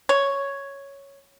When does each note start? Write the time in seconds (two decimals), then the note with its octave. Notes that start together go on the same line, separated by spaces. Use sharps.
0.09 C#5